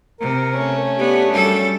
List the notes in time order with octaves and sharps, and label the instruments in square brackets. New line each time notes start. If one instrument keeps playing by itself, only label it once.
[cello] C3 [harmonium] A#4
[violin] A3 C#4
[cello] B3 [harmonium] D4 [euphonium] G4
[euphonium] F#2 [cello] G3 A4